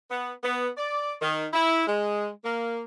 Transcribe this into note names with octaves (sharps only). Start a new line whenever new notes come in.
B3
B3
D5
D#3
E4
G#3
A#3